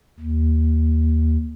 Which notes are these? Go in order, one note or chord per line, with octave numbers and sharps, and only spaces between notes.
D#2